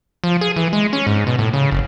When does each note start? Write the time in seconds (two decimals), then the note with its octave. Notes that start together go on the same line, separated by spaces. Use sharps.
0.24 F3
0.41 G#4
0.56 E3
0.73 G#3
0.93 C#4
1.07 G#2
1.27 B2
1.39 A2
1.53 C#3
1.72 F#1